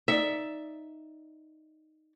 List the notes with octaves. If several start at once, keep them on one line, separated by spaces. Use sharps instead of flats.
D#4 D5 E5